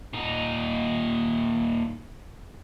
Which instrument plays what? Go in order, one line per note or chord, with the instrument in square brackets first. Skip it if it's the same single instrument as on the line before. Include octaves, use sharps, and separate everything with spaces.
[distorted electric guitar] A#2 D#4